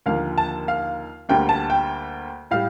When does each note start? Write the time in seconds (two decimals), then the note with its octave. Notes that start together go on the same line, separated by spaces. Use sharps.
0.06 D#2 D3 F3 A#3 F5
0.38 A5
0.68 F5
1.29 D2 D3 G3 A#3 G5
1.49 A5
1.70 G5
2.51 A2 G3 F5